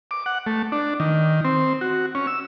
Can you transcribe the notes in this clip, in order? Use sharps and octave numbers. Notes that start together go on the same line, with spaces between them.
D6
F#5
A3
D4
D#3
C4
F#4
C#4
E6